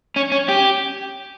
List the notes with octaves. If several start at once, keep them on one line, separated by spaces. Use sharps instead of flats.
C#4
C#4
G4